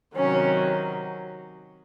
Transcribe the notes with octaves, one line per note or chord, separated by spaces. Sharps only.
C3 D#3 F#3 C#4